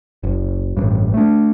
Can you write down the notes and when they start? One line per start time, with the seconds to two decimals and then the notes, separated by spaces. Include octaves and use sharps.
0.23 F#1
0.77 A1 G2
1.14 A3 D4